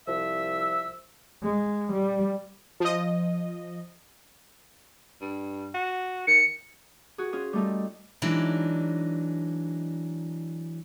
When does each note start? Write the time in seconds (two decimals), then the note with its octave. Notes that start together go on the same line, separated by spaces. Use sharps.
0.08 C2 F3 E5 E6
1.43 G#3
1.92 G3
2.80 F3 D#5
5.21 G2
5.74 F#4
6.27 D#3 C#7
7.18 F#4 G#4
7.33 C#4 F4 G#4
7.53 G3 A3 D#4
8.22 E3 F#3 G#3 D4 D#4